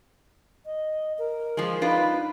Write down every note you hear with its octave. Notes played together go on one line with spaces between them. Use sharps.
D#5
A#4
F3 G#3
D4 D#4 F4 B4